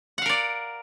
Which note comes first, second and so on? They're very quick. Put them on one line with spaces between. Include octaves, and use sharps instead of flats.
F#5 F5 A#4 D5